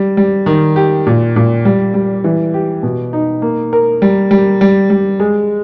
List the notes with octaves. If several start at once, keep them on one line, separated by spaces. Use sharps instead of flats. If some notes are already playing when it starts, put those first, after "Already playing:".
Already playing: G3
G3
D#3
G4
A#2
A#2
G3
G3
E3
G4
B2
D#4
A#3
A#4
G3
G3
G3
G3
G#3